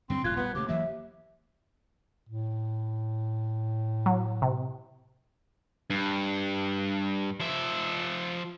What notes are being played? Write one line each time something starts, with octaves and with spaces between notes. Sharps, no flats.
G2 D3 F#3 C4 C6
E1 A2 F#3 F4 F#6 G#6
A#1 G3 B3 B4
D#2 C#3 A3 D6
E3 F#3 A#3 E5
A2
F#3
C3
G2
F3 E5